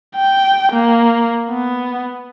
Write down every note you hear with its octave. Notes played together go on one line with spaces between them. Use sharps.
G5
A#3
B3